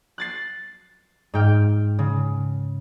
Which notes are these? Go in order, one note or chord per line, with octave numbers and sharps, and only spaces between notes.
F#6 A6 C7
G#2 G5 F6
C#3